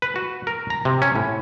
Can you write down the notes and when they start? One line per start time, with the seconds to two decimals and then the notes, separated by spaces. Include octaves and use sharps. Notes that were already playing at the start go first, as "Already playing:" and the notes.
0.02 B4
0.16 F#4
0.47 A#4
0.70 A#5
0.85 C3
1.02 C#4
1.15 A2